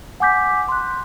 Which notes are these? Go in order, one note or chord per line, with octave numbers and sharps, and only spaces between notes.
F#5 G#5 D6 G6 B6
C6 F#6